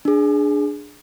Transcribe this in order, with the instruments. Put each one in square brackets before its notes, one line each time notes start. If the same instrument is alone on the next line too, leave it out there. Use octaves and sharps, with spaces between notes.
[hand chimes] D4 G#4